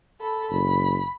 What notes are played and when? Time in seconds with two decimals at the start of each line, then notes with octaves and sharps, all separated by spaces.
0.21 A4 B5
0.50 F#1 B5